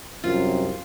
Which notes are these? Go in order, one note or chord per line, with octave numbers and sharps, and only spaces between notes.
C2 F#2 C4 F4